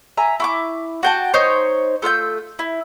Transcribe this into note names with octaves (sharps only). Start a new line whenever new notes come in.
E5 G#5 A#5
E4 C#6 D6
F#4 G5 A5
D#4 C5 C#5
A3 F4 E6 G6
E4